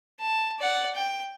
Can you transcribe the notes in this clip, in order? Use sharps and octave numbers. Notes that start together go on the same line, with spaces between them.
A5
D5 F#5
G5